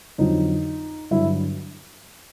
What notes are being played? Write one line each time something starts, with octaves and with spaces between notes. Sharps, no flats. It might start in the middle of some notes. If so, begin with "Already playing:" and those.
F2 D3 F#3 D#4
G2 D3 F#3 E4